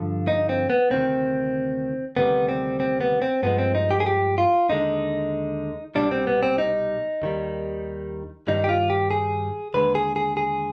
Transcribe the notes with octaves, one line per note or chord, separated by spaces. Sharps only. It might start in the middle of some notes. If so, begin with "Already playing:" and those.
Already playing: G2 D3 F3
D#4
C4
B3
D2 C3 D#3 C4
D2 C3 D#3 G3 B3
C4
C4
B3
C4
G2 F3 G#3 B3
C4
D#4
G4
G#4
G4
F4
D#2 D3 G#3 D#4
C2 B2 G3 D4
C4
B3
C4
D#4
D#2 D#3 G3
G2 D#3 G3 D#4
G4
F4
G4
G#4
D#2 D3 G#3 B4
G#4
G#4
G#4